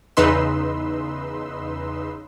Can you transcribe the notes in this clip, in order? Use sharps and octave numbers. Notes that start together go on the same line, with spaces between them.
E2 C#3 D#4 B4 C6 E6